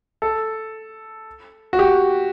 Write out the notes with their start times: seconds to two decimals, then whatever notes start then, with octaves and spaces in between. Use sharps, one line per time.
0.22 A4
1.73 F#4
1.79 G4